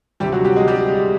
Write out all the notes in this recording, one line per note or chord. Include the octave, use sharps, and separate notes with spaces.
D2 C3 F3 G3 G4
F#3 F#4
G3 G4
G#3 G#4
G3 G4